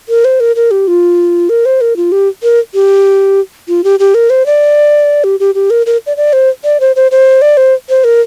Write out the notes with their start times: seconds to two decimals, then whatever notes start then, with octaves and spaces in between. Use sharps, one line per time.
0.09 A#4
0.25 C5
0.40 A#4
0.56 A#4
0.71 G4
0.88 F4
1.49 A#4
1.66 C5
1.81 A#4
1.97 F4
2.12 G4
2.43 A#4
2.74 G4
3.68 F4
3.84 G4
4.00 G4
4.14 A#4
4.30 C5
4.46 D5
5.24 G4
5.40 G4
5.55 G4
5.70 A#4
5.86 A#4
6.07 D5
6.17 D5
6.33 C5
6.64 D5
6.80 C5
6.96 C5
7.12 C5
7.42 D5
7.57 C5
7.89 C5
8.04 A#4